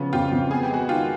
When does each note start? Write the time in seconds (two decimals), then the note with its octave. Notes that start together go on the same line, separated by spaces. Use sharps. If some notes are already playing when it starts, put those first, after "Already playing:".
Already playing: C#3 F3 B3
0.13 F2 F4 G4
0.32 F2
0.51 B3 G#4
0.63 G4
0.70 G#3 F#4 G#4
0.88 D#3 F4 G4